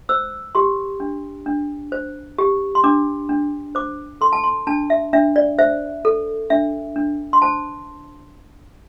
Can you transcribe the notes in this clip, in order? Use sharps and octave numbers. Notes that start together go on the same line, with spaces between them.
C5 E6
G4 C6
D4
D4
C5
G4
C6
D4 D6
D4
C5 D6
A4 C6
A5
C6
D4 A5
E5
D4 E5
D5
C5 E5
A4
D4 E5
D4
C6
C5 A5